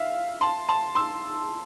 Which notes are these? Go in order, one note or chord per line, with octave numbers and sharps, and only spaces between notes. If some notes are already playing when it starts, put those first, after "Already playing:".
Already playing: E5 F5
A5 C6
A5 C6
C6 E6